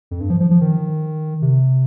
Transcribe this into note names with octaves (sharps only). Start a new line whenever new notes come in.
F2
G2
F3
F3
F3
D#3
C3